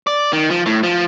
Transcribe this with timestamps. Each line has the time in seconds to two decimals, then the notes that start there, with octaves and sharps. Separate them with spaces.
0.07 D5
0.33 D#3
0.50 F3
0.66 A2
0.83 F3